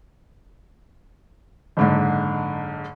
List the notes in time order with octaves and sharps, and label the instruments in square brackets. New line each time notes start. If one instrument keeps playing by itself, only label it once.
[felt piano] F#1 G#2 D3